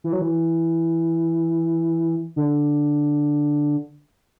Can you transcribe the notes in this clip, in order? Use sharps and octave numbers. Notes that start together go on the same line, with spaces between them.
E3
F#3
E3
D3